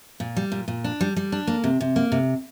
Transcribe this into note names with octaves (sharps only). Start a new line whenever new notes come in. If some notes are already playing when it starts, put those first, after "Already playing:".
A#2
G3
A#2
A#2
D4
G3
G3
D4
A#3
C3
C3
A#3
C3